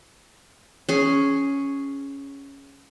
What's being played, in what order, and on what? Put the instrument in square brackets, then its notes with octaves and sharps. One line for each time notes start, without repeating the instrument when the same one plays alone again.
[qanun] C#4 G#4